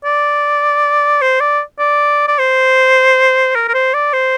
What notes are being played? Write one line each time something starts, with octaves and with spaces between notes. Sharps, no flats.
D5
C5
D5
D5
D5
C5
A#4
A#4
C5
D5
C5